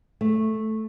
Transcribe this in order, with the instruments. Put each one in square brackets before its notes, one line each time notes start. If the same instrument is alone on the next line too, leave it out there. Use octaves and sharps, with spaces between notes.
[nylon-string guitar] A3